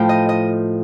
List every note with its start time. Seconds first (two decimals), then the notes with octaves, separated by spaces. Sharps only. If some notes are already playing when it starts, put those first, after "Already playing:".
Already playing: A2 F3 G5
0.09 D#5
0.29 D#5